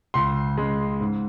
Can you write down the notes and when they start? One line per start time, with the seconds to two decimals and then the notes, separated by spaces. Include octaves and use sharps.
0.14 C#2 C6
0.58 C#3 G#3
1.01 G#2